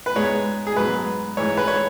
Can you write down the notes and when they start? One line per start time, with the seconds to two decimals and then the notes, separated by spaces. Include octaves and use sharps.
0.06 B4
0.16 G#2 G#3 B3 C#5
0.67 G#4
0.76 G#2 F#3 B3 B4
1.37 G#2 E3 G#3 C#5
1.57 B4
1.68 C#5